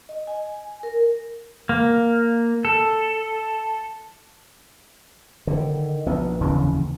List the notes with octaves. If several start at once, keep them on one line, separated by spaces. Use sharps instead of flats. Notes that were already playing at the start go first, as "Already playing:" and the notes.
D#5
G#5
A#4
A#3
A4
D3 D#3
A#1 B3
F1 D#2 C#3 E3